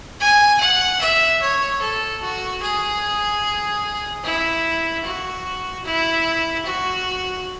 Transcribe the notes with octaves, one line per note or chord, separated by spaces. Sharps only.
G#5
F#5
E5
C#5
A4
F#4
G#4
E4
F#4
E4
F#4